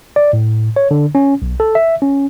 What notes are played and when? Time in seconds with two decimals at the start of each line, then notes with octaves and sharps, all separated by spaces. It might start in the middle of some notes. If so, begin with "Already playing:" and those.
0.16 D5
0.33 A2
0.76 C#5
0.91 D3
1.15 C#4
1.42 B1
1.60 A4
1.75 E5
2.02 C#4